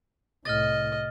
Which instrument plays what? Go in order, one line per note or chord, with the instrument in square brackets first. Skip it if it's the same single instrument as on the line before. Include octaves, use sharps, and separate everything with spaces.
[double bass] C2 A2 [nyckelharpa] D#5 [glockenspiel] F6 A6